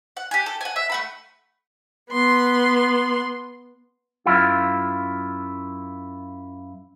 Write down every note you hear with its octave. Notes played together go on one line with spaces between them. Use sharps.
F#5
G4 G#5
A4
F#5 G#5
E5
A3 F#5 B5
B3 C6
F#2 E4 F4